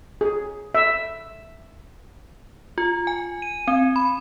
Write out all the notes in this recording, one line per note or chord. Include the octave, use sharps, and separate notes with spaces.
G#4
E5
F4
G#5
D#7
C4
B5